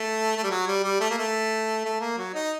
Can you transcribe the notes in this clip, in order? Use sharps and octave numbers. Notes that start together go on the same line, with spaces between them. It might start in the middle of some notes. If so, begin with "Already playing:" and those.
Already playing: A3
A3
G3
F#3
G3
G3
A3
A#3
A3
A3
A#3
F#3
D#4